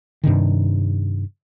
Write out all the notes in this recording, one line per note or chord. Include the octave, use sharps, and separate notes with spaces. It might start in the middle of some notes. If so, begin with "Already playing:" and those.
G2 C3 D#3